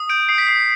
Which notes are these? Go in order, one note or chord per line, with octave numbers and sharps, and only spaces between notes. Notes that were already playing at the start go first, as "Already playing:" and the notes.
Already playing: D#6
G6 D7
D#6 C7
B6
D#6 C7